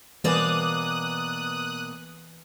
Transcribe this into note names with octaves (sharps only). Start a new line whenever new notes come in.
B2 E3 A#3 B4 D5 G#5 D#6 F#6